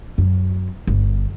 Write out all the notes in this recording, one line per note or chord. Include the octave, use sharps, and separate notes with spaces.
F#2
G1